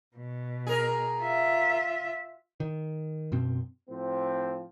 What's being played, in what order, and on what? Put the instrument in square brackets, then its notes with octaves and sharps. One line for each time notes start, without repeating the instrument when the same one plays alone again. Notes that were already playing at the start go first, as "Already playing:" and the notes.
[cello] B2
[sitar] G#4 A#4
[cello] F4 E5
[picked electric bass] D#3
F#2 B2 C4
[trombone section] A2 F3 C4